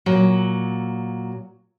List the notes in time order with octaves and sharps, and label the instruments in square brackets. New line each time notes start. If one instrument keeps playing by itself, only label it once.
[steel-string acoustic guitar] A#2 F#3